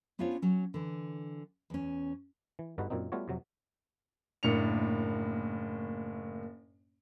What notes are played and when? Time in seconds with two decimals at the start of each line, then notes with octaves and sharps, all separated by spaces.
0.19 B3 C#4 D4 F4 C5 C#5
0.42 F#3 C#4
0.74 D3 E3
1.70 E2 C#4
2.59 E3
2.78 G1 G2 D3 D#4 F#4 B4
2.90 F#2 A#2 A#3 C4 D#4
3.12 G3 A3 B3 F4 F#4 C#5
3.28 F2 C3 F#3
4.43 F#1 A2 A#3 D4 C#7 F7